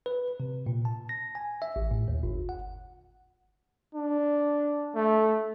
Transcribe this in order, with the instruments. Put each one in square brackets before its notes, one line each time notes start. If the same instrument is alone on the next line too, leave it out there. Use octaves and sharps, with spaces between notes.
[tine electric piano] B4
C3
A#2
A5
A#6
G#5
E5
A1
A2
D#2
G1
F#5
[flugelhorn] D4
A3